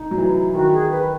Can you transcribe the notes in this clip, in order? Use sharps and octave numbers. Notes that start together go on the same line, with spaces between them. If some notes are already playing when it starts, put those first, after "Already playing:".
Already playing: D#4
F#3
E3
D#3 F#4
G#4
B4